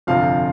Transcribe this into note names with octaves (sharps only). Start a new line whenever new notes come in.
G1 F2 C3 F3 F5